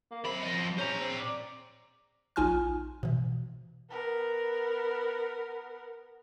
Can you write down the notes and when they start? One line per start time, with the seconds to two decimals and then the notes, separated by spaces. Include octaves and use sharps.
0.11 A#3
0.24 F#2 C4 B5
0.42 F3 D#5
0.78 C#4 C5 A#5
1.00 C4
1.20 D5
2.36 A#1 D#4 F4 G#5 C6 F6
3.03 B2 E3
3.90 B3 A#4